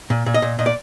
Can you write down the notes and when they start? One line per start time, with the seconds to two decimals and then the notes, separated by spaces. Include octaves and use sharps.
0.10 A#2
0.26 A#2
0.34 D#5
0.42 A#2
0.59 A#2 D#5
0.66 D5